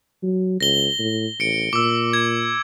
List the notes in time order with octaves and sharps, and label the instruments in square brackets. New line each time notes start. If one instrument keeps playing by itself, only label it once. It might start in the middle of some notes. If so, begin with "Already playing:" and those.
[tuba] F#3
[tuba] C#2 [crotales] A#6 G7
[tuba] A2
[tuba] A1 [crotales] C#7 D7
[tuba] A#2 [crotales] D6 E6
[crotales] G#6